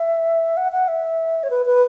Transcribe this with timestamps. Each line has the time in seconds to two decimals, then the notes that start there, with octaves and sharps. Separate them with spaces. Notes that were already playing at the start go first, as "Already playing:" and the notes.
Already playing: E5
0.57 F#5
0.72 F#5
0.88 E5
1.43 C#5
1.50 B4
1.66 B4